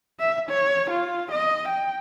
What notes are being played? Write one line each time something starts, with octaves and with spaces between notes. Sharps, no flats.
E5
C#5
F4
D#5
G5